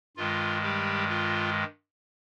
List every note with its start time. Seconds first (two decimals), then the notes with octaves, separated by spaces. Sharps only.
0.17 G2 D#3 G#3 F4
0.63 G3 G4
1.09 F4